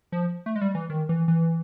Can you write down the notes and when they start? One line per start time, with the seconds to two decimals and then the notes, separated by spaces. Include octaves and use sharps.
0.12 F3
0.46 A3
0.56 G#3
0.61 G3
0.75 E3
0.90 D#3
1.09 E3
1.28 E3